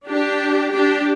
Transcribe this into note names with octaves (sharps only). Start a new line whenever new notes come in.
D4 G4
D4 G4